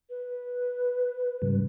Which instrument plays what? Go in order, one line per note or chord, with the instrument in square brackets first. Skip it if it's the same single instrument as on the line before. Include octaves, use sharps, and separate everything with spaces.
[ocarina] B4
[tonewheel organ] G#2 C#3 G3